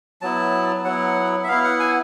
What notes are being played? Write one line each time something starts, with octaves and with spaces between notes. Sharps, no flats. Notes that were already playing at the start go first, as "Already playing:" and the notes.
F#3 B3 E4 A5
F#3 B3 E4 F#5
E5
B3 E4 F5
F#5
G#5